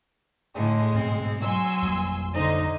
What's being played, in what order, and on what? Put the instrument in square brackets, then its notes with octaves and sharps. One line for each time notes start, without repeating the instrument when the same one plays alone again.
[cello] A2 D3 [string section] G#3
[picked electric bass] G#2 B2 [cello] C4
[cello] F#3 [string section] G#5 C6 E6
[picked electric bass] F2 G3 A#3
[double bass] D3 [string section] D#4 C5 [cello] D#5